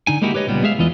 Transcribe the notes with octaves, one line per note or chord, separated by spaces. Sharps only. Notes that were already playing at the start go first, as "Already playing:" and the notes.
D3 D#4 G#5
G#3 A#3 D#4 E4 F#4 G4
G4 B4 C#5 D#5
C#2 A#2 G3 B3
G#3 G#4 E5 F5
E2 E3 F4 D#5